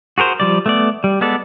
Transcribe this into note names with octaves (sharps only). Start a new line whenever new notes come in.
F#4 G#4 A#4 C5
F3 G3 D5
A3 B3 D5
G3
G#3 B3 A4 D5